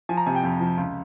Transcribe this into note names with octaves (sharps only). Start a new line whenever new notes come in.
F3 G#5
A#5
C3 G#5
G5
F2
F3
C#2